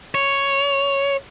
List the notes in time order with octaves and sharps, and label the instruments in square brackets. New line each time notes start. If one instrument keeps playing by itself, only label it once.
[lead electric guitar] C#5